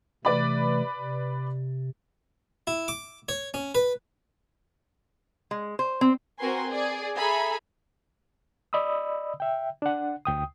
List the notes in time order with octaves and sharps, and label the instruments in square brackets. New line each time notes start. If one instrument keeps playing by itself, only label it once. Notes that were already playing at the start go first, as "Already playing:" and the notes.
[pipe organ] C3 E3 A3 [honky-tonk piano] B4 D5 B5
[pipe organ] C3
[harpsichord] E4
D6
C#5
C#4
B4
[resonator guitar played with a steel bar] G#3
C5
C4
[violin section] C4 F#4 A#4 B4 G#5 C6
G#4 D5
G#4 A4 E5 G#5 A#5 B5
[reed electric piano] D5 D#5 B5 D#6 E6
E5 G5
D4 F#5
D2 G5 D#6